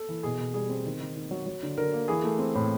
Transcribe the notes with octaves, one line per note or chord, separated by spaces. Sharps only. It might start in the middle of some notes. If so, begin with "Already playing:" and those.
Already playing: A4
E3
B2 G#4
B2
G3 G#4
C4
D#3
D#3
D#3
F#3
F#3
D3
D3 A#4
A#3
E3 G#4
A3
C4
A2